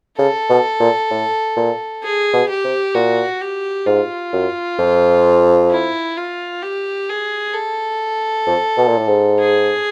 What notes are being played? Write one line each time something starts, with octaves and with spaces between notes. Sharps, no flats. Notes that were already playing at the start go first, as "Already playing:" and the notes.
C#3 A4
B2
A#2
A2
A#2
G#4
B2
G4
C3
A#2 F#4
G4
G#2 F4
F#2
F2
E4
F4
G4
G#4
A4
F2
B2
A#2
A2
G#2
G#4